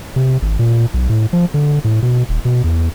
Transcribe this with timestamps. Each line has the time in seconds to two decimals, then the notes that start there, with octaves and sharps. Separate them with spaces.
0.16 C3
0.42 G#1
0.59 A#2
0.94 B1
1.09 A2
1.33 F3
1.54 D3
1.84 A2
2.03 B2
2.29 D#1
2.45 B2
2.64 E2